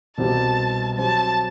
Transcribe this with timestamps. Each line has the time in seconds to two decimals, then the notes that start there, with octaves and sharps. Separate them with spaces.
0.18 C2 B2 G3 C4 G4 A5
0.98 F#3 C4 G4 C5 A5